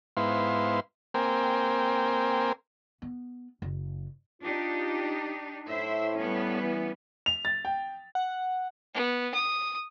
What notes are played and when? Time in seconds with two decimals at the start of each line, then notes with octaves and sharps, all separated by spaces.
0.17 G#2 B3 E4 C5 F5 C6
1.14 A#3 C4 A#4 C5 G5 G#5
3.02 B3
3.62 F#1
4.42 D4 D#4 F4 G4
5.68 A2 E4 C5 E5
6.17 G3 B3 C#4
6.61 E3
7.26 F7
7.45 A6
7.65 G5
8.15 F#5
8.94 B3
9.34 D#6